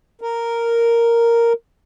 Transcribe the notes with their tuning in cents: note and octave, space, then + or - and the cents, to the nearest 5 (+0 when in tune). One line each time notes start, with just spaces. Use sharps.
A#4 -5